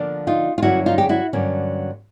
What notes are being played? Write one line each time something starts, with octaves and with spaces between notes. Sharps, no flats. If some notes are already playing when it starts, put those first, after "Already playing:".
Already playing: D3 F3 A#3 D4
D#4 F4
F4
G2 D3 F#3 A#3 C#4 E4 F#4
D#4 F4
G4
E4 F#4
G2 D3 F#3 A#3 C#4